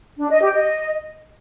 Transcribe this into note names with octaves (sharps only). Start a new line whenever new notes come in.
D4
D#5
G4
D#5